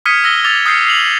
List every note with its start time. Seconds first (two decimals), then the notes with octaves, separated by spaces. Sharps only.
0.05 D#6 F6 G#6 B6 C#7 D#7
0.24 E6 A#6 G7
0.45 D6 E6 A6 F7
0.66 D#6 F6 G6 C7 C#7
0.87 C7 F7 F#7